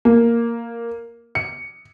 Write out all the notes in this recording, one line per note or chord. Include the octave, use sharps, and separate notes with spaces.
A#3
C#7